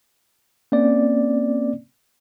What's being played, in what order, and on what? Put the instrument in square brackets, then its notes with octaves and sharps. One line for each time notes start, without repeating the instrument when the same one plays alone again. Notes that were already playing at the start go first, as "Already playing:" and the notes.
[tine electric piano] A#3 C4 C#4 D5